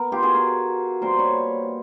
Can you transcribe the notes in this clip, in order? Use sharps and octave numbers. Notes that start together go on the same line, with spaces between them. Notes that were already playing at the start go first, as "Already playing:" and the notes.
Already playing: B3 A#4
F4 G4
F#4 G#4
G#4 A#4
A#2 G3 C4 F4 A#4 C5
B4 C#5